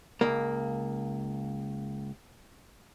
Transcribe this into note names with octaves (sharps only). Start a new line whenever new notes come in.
C#2 A#3